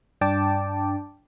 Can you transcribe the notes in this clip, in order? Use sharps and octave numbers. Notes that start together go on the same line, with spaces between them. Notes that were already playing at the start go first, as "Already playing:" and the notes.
G2 D4 G5 A5 D6